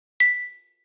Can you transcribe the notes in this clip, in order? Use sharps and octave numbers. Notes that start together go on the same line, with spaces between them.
B6